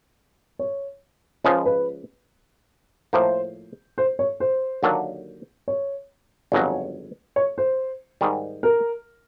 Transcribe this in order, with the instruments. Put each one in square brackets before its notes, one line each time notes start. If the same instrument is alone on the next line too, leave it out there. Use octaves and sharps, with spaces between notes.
[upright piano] C#5
[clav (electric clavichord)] C#2 C#3 F3 G#3 [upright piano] C5
[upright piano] B4
[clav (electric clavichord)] A2 F3 A#3 [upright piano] C5
[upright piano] C5
C#5
C5
[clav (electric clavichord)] D#2 D3 F#3 A#3 D4
[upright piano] C#5
[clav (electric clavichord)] G1 F2 C#3 F#3 [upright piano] C#5
[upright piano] C#5
C5
[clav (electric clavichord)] G#2 D#3 G3
[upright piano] A#4